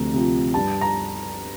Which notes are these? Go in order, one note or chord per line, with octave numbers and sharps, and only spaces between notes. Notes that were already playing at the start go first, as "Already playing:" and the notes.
Already playing: D2 C3 F3 A#5
C3 F3
G2 A5
A#5